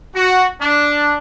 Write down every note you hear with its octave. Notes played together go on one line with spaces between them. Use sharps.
F#4
D4